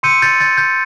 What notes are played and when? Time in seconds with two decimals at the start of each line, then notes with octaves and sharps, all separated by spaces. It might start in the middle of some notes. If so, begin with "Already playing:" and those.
0.03 C6 E6 G6 C#7 D#7
0.22 G6 A6
0.40 G6 A6
0.57 G6